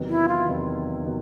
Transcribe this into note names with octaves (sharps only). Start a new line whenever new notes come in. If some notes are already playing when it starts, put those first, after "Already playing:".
Already playing: E2 C3 D#3 F#3 B3
E4
F4
E2 C3 D#3 F#3 B3
C3 D#3 F#3 B3